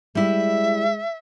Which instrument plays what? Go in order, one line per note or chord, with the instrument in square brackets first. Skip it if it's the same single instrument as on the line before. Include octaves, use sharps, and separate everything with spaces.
[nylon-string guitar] G3 E4 [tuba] G#3 [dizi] E5